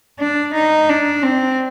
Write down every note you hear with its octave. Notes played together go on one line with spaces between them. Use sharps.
D4
D#4
D4
C4